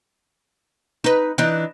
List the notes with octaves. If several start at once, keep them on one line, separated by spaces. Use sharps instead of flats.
D#4 B4
E3 D4 D#4